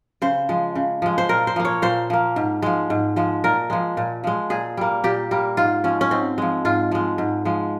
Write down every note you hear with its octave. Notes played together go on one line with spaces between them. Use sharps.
C#3 C5
F3 G#3
C#3
F3 G#3
C5
A#2 A#4
C5
F3 A#3
C#5
A#2 C5
F3 A#3
G#2
F3 G#3
G#2
F3 G#3
A#2 A#4
F3 G#3
A#2
F3 G#3
A#2 G#4
G3 A#3
A#2 G4
G3 A#3
G#2 F4
F3 G#3 C#4
C#4
G#2 C4
F3 G#3
G#2 F4
F3 G#3
G#2
F3 G#3